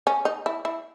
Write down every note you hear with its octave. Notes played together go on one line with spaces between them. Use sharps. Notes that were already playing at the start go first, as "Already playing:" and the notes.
C#4
D#4
E4
E4